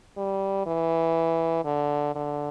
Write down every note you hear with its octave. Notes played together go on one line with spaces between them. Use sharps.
G3
E3
D3
D3